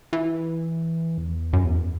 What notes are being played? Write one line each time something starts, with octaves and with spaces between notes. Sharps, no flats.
E3
E2
F#2
E2